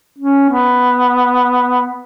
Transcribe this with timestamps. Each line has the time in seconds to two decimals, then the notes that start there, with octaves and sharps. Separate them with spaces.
0.18 C#4
0.50 B3